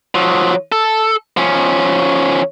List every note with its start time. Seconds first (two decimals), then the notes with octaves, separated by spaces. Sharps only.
0.15 F3 F#3
0.72 A4
1.37 F3 C#4